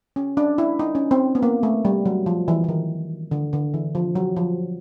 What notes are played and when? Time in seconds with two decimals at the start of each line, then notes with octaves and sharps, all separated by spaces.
0.16 C#4
0.37 D4
0.58 E4
0.79 D#4
0.95 C#4
1.11 C4
1.35 B3
1.42 A#3
1.63 A3
1.85 G3
2.06 F#3
2.26 F3
2.48 E3
2.64 E3
2.69 D#3
3.31 D3
3.53 D3
3.74 E3
3.95 F3
4.15 F#3
4.36 F3